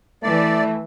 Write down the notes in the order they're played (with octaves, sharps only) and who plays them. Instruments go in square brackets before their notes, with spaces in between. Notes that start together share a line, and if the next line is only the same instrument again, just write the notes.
[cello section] E3 [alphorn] A3 [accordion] D5